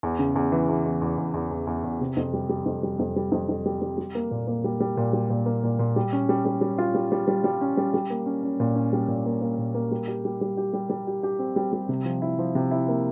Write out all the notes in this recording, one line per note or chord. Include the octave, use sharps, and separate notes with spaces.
E2
C#3
E2
E3
E2
E2
E2
E2
E2
E2
E2
E2
C3
F2
G3
G3
F2
G3
F2
G3
F2
F2
G3
G3
G3
A#3
A#2
A#3
G3
G3
A#2
G3
A#2
A#3
A#2
A#2
G3
C#4
G3
G3
G3
F4
G3
G3
G3
G3
C#4
G3
G3
A#3
C#4
C#4
A#2
C#4
G3
A#2
A#3
A#3
A#2
A#3
G3
G4
G3
G3
G4
G3
G3
G4
G4
C4
G3
G3
C3
F3
E4
F3
C3
E4
A#3